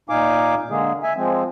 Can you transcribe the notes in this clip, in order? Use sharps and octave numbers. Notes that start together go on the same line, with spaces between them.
A#2 D#4 F5 G#5 D6
D3 G#3 A#3 G#4
E5 G#5
F3 G#3 C4